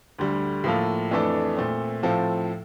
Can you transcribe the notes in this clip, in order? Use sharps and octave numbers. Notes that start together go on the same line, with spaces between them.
D2 D3 G3
A2 F3 A#3 F4 A4
F2 E3 A3 D4 A4
A#2 A3 C4
A2 F3 C4 F4 A4